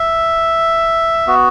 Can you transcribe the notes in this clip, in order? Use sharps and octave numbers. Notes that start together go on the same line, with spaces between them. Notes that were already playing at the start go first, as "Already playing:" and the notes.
Already playing: E5
B3 F#4